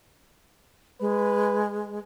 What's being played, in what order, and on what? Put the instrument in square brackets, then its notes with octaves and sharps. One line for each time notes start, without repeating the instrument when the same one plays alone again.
[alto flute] G#3 [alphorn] B4